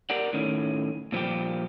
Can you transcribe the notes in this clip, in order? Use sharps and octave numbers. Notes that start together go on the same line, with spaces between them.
G4 A#4 D5 F#5
A2 D#3 C#4
A#2 F3 G3 G4